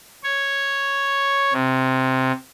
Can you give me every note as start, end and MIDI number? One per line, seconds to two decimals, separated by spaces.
0.24 1.53 73
1.53 2.32 48